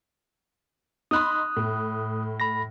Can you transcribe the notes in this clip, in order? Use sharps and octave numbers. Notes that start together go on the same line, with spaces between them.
D#4 B5 C6 D#6 F#6
A2
B5 A#6